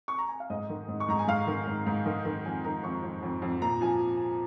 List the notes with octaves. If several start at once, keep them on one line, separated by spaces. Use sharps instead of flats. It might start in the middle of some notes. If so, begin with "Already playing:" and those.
C#6
A#5
G#5
F5
G#2 D#5
D#3
G#2
C#6
G#2 A#5
G#5
G#2 F5
D#3
G#2
G#2
D#3
D#3
F2 G#5
D#3 A#5
F2 C#6
F2
F2
F2
A#2 A#5
F3 G#5